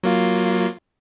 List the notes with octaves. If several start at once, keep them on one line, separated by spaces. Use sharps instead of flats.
F#3 A#3 F4